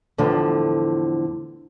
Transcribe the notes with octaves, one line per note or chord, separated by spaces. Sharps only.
E2 A2 D3 F3